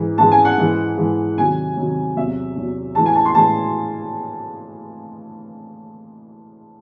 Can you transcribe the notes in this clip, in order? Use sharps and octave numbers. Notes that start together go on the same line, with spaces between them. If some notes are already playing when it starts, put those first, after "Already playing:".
Already playing: G#2 E3 G#3
G#2 E3 G#3 A5
G#5
F#5
G#2 E3 G#3
G#2 E3 G#3
C3 D#3 F#3 G#5
C3 D#3 F#3
E2 C3 F#3 E5
E2 C3 F#3
A2 E3 G#3 A5
G#5
A5
C6
A2 E3 G#3 A5